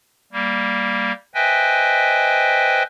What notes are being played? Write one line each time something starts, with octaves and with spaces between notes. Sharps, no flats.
G3 A#3
B4 C5 D#5 E5 G5 G#5